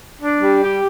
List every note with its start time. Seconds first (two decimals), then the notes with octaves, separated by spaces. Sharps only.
0.21 D4
0.41 G3
0.61 G4